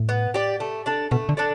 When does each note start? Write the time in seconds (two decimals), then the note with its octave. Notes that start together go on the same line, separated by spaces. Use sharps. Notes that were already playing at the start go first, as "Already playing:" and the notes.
Already playing: A2
0.09 B3
0.34 G4 D5
0.60 A3
0.86 D4 A4 D5
1.11 B2 A3
1.29 D3
1.37 D4 A4 D5